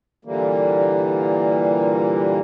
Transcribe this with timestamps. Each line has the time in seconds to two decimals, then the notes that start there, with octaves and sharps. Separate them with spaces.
0.25 A#2 D3 E3 G3 A#3